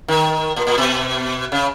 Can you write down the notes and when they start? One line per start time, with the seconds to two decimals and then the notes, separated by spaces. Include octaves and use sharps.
0.08 D#3
0.56 A#2
0.67 A#2
0.78 B2
1.52 C#3